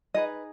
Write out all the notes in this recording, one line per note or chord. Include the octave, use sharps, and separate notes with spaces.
D#4 G#4 B4 D#5